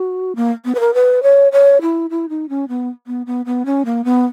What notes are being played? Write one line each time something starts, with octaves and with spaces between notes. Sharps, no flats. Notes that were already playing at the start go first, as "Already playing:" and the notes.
Already playing: F#4
A#3
B3
B4
A#4
B4
C#5
C#5
E4
E4
D#4
C#4
B3
B3
B3
B3
C#4
A#3
B3